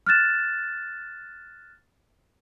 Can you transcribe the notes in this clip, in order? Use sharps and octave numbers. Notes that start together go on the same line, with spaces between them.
F6 F#6 A6 E7